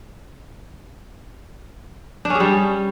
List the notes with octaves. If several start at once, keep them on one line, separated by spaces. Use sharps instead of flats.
D4
C#4
G#4
G3